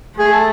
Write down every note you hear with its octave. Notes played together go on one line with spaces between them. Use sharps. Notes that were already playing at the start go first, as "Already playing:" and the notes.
A3 G#4
A4